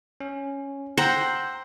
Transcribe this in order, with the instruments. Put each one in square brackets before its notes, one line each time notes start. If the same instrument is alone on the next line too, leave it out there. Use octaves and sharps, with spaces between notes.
[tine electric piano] C#4
[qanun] C5 [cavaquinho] F#5 G5 A#5 [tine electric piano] E6 A#6